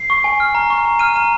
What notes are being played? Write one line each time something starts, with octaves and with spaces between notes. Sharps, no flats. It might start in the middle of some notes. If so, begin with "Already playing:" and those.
Already playing: C7
C#6
G#5
F6
A#5
C#6
A#5
F6 D#7
A#5